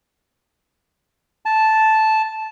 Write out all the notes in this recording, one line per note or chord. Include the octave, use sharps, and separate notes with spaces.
A5